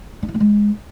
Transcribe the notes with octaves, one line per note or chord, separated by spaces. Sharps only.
D4
E4
A#3
G#3